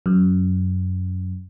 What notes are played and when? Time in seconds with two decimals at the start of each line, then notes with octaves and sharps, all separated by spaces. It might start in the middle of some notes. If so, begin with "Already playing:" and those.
0.06 F#2